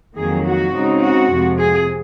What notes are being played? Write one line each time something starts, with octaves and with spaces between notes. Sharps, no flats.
F2 D#3 F#3 A#3 G#4
F#4
C#3 G#3 C4 D#4
F#4
F2 C3 F3 G#3
G#4